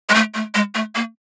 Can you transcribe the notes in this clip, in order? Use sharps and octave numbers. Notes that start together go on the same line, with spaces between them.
G#3
A3
A3
G#3
A3
A#3